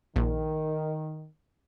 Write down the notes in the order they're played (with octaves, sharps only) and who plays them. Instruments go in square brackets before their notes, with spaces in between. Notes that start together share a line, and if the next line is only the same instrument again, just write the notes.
[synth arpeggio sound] A#1 [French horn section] D#3